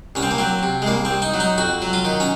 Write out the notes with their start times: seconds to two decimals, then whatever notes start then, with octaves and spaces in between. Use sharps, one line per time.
0.15 C2 C#4
0.22 C4
0.31 A#3
0.38 F#3 C4
0.63 C3
0.82 G#3
0.87 C2 A#3
1.05 C4
1.11 C2
1.22 D#4
1.34 F#3
1.40 D#4
1.58 F2 F#4
1.82 F#3
1.93 F4
2.05 D#3
2.20 C#4